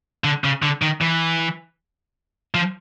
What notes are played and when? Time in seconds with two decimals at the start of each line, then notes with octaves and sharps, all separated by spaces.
0.24 D3
0.44 C#3
0.63 D3
0.82 D#3
1.01 E3
2.54 F3